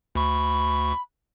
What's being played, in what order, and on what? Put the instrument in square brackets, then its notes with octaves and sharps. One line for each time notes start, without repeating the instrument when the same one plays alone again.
[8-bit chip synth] D2 C#6 [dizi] B5